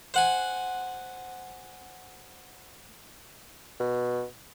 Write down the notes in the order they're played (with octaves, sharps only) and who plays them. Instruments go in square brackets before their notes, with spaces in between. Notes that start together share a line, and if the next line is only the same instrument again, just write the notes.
[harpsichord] C5 F#5 G#5
[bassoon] B2